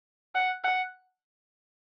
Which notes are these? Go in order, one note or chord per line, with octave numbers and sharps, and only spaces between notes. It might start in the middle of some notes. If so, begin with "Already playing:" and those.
F#5
F#5